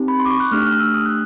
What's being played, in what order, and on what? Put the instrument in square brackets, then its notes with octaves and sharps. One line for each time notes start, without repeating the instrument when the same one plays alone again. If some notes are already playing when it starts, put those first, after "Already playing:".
Already playing: [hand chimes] C4 D#4 G4
B5
C6
D6
C#6
F#6
A3 D4 G4 F6
F6
E6
D#6
F#6